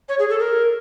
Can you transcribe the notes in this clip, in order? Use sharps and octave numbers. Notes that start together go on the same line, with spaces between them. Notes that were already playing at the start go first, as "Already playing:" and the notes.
C#5
G#4
A4
A#4